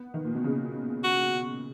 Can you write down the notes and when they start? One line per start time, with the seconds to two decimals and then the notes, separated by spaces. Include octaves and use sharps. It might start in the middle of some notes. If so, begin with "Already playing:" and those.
Already playing: B3
0.14 D#3
0.25 A#2
0.35 B2
0.44 C#3
1.04 F#4